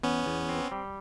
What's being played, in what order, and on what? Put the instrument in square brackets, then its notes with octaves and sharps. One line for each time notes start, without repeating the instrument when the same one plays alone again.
[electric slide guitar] E2 [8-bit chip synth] B3 C#4
[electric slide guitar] E2
C4
G3